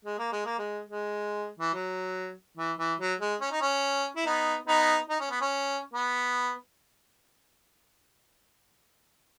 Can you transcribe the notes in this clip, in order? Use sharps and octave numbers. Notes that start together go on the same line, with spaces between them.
G#3
A#3
G#3
A#3
G#3
G#3
E3
F#3
E3
E3
F#3
G#3
C#4
D#4
C#4
E4
B3 D#4
B3 D#4
D#4
C#4
B3
C#4
B3